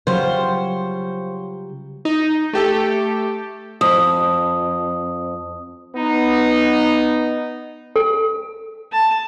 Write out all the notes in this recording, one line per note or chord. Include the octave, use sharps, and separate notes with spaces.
C#3 F#3 G3 F4 C5 C#5
D#4
A3 G4 A4
F2 D#6
B3 D#4
A4
A5